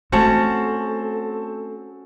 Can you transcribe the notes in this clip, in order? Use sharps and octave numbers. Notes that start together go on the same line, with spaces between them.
A3 C4 C#4 F#4 A4 C5 A5